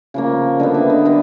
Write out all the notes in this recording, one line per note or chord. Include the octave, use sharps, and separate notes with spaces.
C#3 F3 A#3
D3 G3 B3 D#5
E5
D#5
D5
D3 G3 B3 D#5